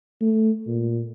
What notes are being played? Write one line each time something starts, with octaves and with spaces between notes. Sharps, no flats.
A3
A#2